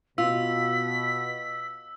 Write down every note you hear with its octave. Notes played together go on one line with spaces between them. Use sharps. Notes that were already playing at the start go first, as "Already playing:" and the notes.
B2 F4 E6 B6